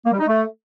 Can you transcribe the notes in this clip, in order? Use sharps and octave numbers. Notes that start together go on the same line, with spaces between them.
A#3
G3
D#4
A3